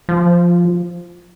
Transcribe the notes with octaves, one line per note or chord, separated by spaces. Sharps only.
F3